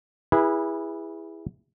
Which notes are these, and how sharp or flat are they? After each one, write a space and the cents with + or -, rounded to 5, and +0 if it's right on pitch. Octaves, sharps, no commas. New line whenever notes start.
E4 +0 G#4 -30 B4 -20